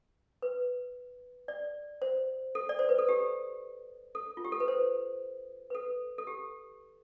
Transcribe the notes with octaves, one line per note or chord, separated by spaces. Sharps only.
B4
D5
C5
A4
D5
C5
B4
A4
G4
A4
F4
G4
A4
B4
C5
B4
A4
A4
G4